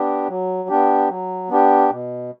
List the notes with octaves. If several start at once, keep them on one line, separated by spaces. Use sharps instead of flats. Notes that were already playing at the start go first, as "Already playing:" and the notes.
Already playing: B3 D4 G4
F#3
B3 D4 G4
F#3
B3 D4 G4
B2